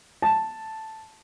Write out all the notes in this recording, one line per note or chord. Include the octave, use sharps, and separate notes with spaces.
A5